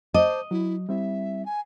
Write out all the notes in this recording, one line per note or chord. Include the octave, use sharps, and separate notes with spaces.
C5 D#5 A5 D6
F#3 E4
G3 C4 E4 E5
G#5